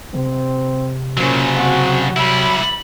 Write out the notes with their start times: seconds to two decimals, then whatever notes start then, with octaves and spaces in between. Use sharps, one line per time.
0.14 C3 C4
1.17 A#2 C#3 F#3 C#4 C5
1.57 C4 F#4
2.17 F#3 G3 E4 B5